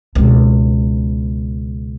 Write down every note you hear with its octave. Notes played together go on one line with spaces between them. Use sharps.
C#2 B2